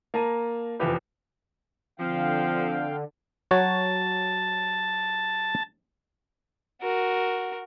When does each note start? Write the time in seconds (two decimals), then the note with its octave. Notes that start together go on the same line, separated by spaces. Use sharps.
0.14 A#3 A5 A#5 D#7
0.79 F1 E2 F3 G4 B4
2.00 D3 F3 C4 F5 G5
3.51 F#3 F#4 C#5 A5
6.82 F#4 A#4